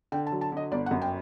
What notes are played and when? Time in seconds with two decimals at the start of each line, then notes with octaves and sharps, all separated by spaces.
0.12 D3 G5
0.27 A5
0.32 F#3
0.41 A5
0.52 D3 D#5
0.72 G1 D5
0.86 F#5
0.91 F#2
1.02 G5